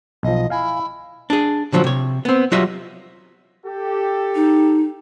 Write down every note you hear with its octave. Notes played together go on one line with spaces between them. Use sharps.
B1 F3 D#5
E4 F5 G#5
D4 G#4
A#2 D3 F3 F#3
C3 C#5
B3 C4
F#3 G3 F4 D#5 E5
G4 A4
D#4